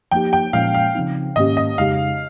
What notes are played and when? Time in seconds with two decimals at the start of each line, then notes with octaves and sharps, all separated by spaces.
0.11 F3 A#3 D#4 G4 G5
0.33 G5
0.53 A#2 F3 G#3 C#4 F5
0.74 F5
0.95 C#3 F3 C4 D#4
1.36 G#2 D#3 A#3 C#4 G4 D#5
1.57 D#5
1.78 F2 C#3 G#3 D#4 G4 F5